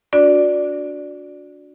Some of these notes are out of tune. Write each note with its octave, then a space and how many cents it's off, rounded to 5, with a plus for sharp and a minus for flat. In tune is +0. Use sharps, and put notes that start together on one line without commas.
D4 -25 F#4 -30 D5 +0